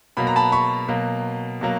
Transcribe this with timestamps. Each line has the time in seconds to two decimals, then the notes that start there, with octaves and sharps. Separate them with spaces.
0.17 B2 F#3 A#3 B5
0.27 A#5
0.36 A5 B5
0.52 B5 C#6
0.88 B2 F#3 A#3
1.61 B2 F#3 A#3